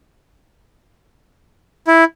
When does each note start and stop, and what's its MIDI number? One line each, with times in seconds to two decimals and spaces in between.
1.87 2.04 64